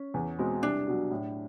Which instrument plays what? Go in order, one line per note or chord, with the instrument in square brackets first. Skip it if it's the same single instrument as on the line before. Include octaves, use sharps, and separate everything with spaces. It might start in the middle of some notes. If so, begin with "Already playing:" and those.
Already playing: [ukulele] C#4
[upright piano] E2
B2 G#3 C4
[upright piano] C2 [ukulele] D4
[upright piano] B2 F#3
A2